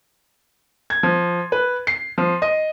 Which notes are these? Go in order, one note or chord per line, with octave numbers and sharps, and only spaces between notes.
G#6
F3
B4
C7
F3
D#5